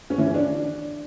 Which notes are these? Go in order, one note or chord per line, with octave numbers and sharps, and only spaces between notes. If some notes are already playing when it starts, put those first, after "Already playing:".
C#4
E3
C#4
D4